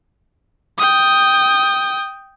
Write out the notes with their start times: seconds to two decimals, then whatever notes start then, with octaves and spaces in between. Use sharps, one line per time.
0.78 G5 D#6